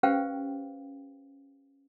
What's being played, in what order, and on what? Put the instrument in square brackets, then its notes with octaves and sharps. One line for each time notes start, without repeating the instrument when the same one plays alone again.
[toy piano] C#4 G4 B4 C5 F5 G5